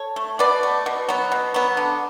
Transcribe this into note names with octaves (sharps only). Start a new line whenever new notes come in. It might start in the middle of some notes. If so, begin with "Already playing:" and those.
Already playing: A4 C#5
A3
B2 B4 D5
A3
B2
F#3 B3
B2
F#3 B3
D3